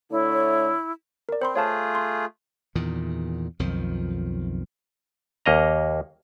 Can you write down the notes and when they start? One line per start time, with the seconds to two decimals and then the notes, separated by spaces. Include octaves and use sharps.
0.11 D3 A3 E4 C#5
1.29 A#4 D5
1.42 C4 C5 B5 C6
1.55 A3 F4 G#4 C#5 F5 A5
1.95 C6
2.75 E2 A#2 D#3
3.59 B1 F2 D#3 F3
5.46 D#2 A#3 D#5 A#5